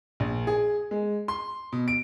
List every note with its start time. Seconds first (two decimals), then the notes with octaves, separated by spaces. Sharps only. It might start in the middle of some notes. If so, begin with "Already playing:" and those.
0.20 A#1
0.47 G#4
0.91 G#3
1.28 C6
1.72 B2
1.88 D7